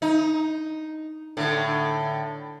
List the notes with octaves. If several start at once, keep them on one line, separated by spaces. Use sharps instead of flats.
D#4
A2 D3